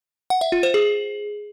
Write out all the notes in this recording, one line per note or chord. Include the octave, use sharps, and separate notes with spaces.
F#5
E5
F4
C5
G#4